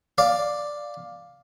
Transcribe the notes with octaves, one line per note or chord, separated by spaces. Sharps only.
D5 F5